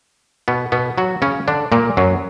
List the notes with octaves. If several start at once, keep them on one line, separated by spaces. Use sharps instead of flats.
B2 B3
B2 B3
F#3 F#4
C#3 C#4
D3 D4
A#2 A#3
F#2 F#3